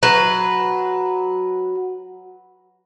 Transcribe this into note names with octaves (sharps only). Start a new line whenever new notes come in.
F#3 B4